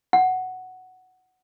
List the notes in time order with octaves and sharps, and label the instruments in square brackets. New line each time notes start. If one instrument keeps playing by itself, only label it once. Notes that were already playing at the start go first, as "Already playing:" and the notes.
[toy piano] F#5